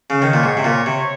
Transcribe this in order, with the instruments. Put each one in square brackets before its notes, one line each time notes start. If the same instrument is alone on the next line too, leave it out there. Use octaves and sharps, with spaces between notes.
[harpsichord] C#3
[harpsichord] D#3 [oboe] C#5
[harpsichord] A#2
G#2
C3
A#2
C3